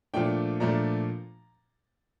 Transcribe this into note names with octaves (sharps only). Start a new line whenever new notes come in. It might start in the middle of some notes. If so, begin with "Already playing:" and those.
A#2 F3 A3 D4 G5
A#2 F3 A3 D4 A#5